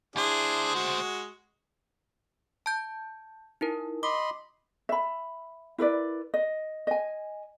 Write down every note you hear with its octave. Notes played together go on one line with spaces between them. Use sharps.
D2 D4 E4 G#4 C5
G#3 F#4
A5 G6
D#4 E4 A#4
D#5 B5 C6 D6
E5 B5
E4 A#4 B4 D5
D#5
D#5 G#5